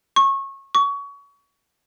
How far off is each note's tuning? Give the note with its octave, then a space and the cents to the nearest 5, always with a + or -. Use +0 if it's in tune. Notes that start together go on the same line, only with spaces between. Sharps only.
C#6 -25
C#6 +25